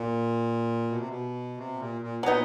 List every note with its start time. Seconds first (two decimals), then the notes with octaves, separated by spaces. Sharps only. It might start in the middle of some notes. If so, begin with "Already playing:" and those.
Already playing: A#2 A#3
0.90 B2
0.99 C3
1.09 B2
1.57 C3
1.74 B2
1.79 A#2
2.01 A#2
2.23 A#2 F#3 B3 D#4